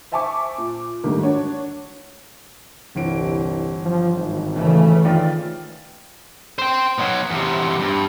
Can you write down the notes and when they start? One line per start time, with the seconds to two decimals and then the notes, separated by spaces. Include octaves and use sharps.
0.12 C5 E5 G#5 A5 C#6 D6
0.58 A#2
1.04 G#2 D3 D#3 G3 A3 A#3
1.23 D4 F#4 C#5
2.96 G1 C2 E3 D7
3.85 F3
4.16 G#1
4.54 C#3 E3 A3
5.05 D#3 F4 D5
6.59 C5 G5
6.98 B2 F#3
7.30 E2 C3
7.80 G2